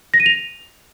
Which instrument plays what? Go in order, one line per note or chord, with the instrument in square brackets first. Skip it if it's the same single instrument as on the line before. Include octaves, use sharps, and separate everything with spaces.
[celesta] A#6
D#7
F7